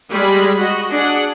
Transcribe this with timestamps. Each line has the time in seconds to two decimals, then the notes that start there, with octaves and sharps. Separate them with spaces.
0.10 G3 G#3 G#4 B5
0.59 F#4 D#5
0.91 D4 G#4 F#5